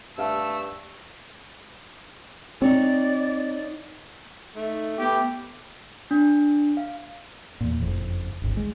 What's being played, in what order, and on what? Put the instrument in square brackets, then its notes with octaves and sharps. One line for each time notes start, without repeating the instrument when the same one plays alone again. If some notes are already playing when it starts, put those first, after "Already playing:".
[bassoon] G2 [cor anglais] A3 [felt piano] E5 F5 [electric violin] E6
[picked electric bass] C4 [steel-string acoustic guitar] D#4 C#5 [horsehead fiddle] D5
[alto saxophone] A3 [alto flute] D#4
[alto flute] B3 [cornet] G4
[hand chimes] D4
F5
[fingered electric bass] E2 A#2
F#1 F2
D1 G#1
G#3